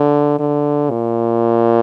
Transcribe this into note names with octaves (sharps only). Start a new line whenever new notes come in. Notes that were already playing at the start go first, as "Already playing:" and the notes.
Already playing: D3
D3
A#2